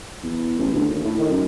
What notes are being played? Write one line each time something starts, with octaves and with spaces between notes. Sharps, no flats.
E2
A1
D2
D#2
A2
D#3
F#2